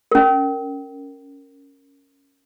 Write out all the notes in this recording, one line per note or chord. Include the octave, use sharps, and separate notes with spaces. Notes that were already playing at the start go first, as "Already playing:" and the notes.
C#4 A#4